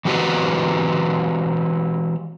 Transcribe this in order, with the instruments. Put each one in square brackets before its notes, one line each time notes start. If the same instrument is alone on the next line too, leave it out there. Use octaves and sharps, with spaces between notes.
[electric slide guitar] E3 G#3 C4 F#4 G4 B4